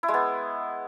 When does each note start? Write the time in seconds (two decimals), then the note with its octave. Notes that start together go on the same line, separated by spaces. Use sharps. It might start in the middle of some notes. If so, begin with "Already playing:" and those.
0.03 E4
0.08 G#3
0.14 B3